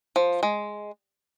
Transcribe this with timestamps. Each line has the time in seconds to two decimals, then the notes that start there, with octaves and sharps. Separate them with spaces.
0.16 F3
0.43 G#3